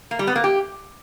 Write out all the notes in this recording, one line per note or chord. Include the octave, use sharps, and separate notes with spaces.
A#3
G3
B3
A#3
G4